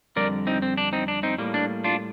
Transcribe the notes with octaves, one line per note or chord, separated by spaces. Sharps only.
F2 D3 G3 A#4 D5
C4 D#4
C4
D4
C4 D#4
D4
C4 D#4
A2 G3 A#3
D4
D4 F4